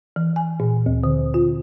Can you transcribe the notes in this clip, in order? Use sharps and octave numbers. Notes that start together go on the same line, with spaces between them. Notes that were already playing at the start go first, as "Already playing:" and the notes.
E3
G#5
A#2
D2
D3
F4